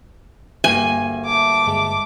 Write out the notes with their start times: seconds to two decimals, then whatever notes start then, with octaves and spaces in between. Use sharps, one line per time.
0.64 D2 G2 A#3 G#5
1.25 A3 D6
1.67 G1 G#3